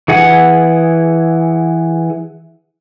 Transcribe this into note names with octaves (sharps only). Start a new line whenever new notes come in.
E3 G#4 F#5